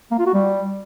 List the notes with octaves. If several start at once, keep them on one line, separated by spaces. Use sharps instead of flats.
A#3
F4
F#4
G3